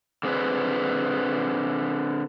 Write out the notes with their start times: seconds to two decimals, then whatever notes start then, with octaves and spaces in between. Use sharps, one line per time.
0.23 D3 C4 G#4 B4